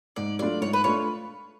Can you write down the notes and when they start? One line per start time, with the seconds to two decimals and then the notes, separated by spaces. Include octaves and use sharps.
0.16 G#2 D5
0.39 F#3 A3 D4 F4 D5
0.61 G#2 C#5
0.73 B4
0.84 A3 D4 F4 C#5